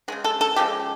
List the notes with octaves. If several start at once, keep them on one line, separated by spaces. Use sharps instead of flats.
C#3 F3 G#3 G#4
A4
A4
C#3 F3 G#3 G4